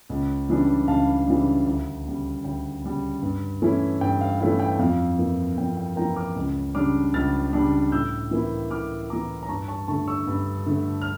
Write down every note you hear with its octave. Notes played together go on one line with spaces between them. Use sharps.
C#2
C#3 E3 G3 D4
C#2 F5 A5
C#3 E3 G3 D4
D2
C#3 G3
D2 G5
C#3 G3
G2
E3 A3 C#4 E4
G2 G5
F5
E3 A3 C#4 E4 F5
G5
G5
F2 F5
E3 A#3
F2 G5
G5
E3 A#3 G5 A#5
D6 F6
C#2
C#3 G3 D4 D6 F6
C#2 F6 A6
C#3 G3 D4
A2 E6 G6
E3 A#3 E4
A2 D6 F6
E3 A#3 E4 A#5 D6
A#5
G2 A5 C#6
A5 C#6
D3 A3 A5 C#6
C#6 E6
G2
D3 A3
F6